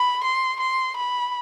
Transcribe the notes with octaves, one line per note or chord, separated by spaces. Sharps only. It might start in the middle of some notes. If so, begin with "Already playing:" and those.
Already playing: B5
C6
C6
B5